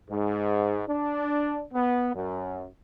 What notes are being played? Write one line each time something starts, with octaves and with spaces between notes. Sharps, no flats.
G#2
D4
B3
F#2